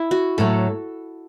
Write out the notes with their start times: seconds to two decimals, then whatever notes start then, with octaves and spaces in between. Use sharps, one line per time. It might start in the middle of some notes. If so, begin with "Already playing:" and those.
Already playing: E4
0.11 F#4
0.38 A2 F#3 A3 A4